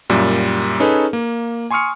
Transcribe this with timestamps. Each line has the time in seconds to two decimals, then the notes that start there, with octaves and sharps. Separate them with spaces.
0.10 F#2 A#2 G3
0.80 C#4 D#4 G#4 A4 B4
1.13 A#3
1.71 G#5 C6 C#6 D#6 F6 C#7